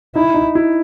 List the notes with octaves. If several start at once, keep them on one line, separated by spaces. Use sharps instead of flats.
D#4 E4
D#4
E4